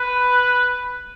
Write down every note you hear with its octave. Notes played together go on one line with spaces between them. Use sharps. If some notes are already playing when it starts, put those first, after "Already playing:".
Already playing: B4